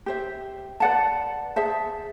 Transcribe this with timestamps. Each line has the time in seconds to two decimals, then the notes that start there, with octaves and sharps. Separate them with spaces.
0.06 G4 C5 E5
0.80 B4 D5 F#5 A5
1.56 G#4 C5 E5 A5